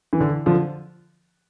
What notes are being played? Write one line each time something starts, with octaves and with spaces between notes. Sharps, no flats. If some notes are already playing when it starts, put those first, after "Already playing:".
E3
D3
D3 F3